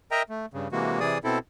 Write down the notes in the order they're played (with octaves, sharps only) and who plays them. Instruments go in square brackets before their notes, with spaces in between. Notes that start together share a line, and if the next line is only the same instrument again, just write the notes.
[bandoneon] A#4 D#5 E5 G5 A#5
A3
G2 C#3
C3 E3 G#3 A#3 F#4
C3 E3 G#4 D5 D#6
B2 C4 E4 A4